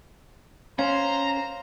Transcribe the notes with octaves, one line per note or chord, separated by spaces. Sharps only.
C#4 C5 F5 A#5